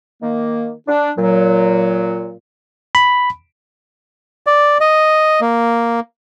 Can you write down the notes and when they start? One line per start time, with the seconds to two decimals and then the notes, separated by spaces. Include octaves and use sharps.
0.22 D#3 A#3
0.88 D4
1.17 A#2 F#3
2.95 B5
4.47 D5
4.81 D#5
5.41 A#3